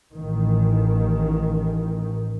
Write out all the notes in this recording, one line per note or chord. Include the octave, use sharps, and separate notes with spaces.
A1 D#3